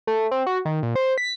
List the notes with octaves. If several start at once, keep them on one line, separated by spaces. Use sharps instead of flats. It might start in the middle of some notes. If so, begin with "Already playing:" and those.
A3
C4
F#4
D#3
A#2
C5
B6